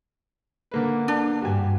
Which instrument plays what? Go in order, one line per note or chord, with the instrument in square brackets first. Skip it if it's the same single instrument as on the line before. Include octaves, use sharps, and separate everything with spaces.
[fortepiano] D3 A#3 B4
[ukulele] D4
[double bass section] G2 [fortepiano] F#4 G4 G#5